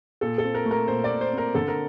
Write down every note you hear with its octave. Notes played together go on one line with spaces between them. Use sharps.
A#2 A4
A4
C4
A#4
A3
A#4
A#2 C5
D5
A#2
C5
C4
A#4
D3 A4
A#4